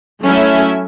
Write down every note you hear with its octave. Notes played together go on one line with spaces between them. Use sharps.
F#3 A3 C#4 E4 E5